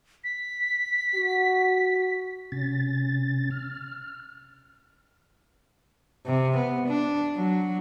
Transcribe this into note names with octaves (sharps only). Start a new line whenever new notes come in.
B6
F#4
C3 C#4 A6
F6
C3
B3
D4
F#3